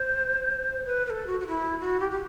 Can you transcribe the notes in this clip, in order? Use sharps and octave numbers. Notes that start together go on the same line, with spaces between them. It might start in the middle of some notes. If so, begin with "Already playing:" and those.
Already playing: C5
B4
B4
A4
F#4
F#4
E4
F#4
G4
G4